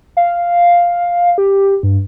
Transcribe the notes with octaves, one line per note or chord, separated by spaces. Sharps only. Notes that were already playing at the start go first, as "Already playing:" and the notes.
F5
G4
G2